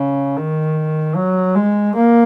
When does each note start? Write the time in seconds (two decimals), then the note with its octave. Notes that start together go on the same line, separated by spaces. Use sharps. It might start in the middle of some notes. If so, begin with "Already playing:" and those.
Already playing: C#3
0.37 D#3
1.16 F#3
1.55 G#3
1.95 A#3